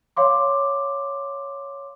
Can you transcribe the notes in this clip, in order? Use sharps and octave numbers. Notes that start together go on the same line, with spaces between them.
C#5 F5 C6 D6